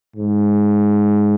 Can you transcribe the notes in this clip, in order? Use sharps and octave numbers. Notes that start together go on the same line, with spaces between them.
G#2